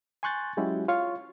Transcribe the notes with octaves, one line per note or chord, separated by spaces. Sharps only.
G#5 C6 C#6 F#6 G6 A6
F#3 G#3 C#4 E4 F#4 G4
F4 C#5 F5 C#6